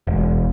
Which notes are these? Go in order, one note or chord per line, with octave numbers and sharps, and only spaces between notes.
E1